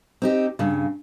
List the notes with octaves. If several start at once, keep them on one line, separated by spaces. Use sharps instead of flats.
C4 D#4 G4
G2 C#3